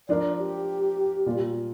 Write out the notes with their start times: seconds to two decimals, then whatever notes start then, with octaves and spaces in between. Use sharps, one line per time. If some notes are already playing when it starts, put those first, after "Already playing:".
0.08 F3 D4 A#4 D5
0.38 G4
1.26 A#2 G3 A#3 F4